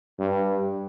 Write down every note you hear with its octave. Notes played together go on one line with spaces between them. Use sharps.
G2